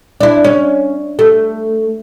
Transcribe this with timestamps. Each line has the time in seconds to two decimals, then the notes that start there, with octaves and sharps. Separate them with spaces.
0.21 D4 E4
0.44 C#4
1.19 A3